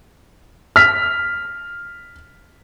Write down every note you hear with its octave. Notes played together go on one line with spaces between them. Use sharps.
F6 B6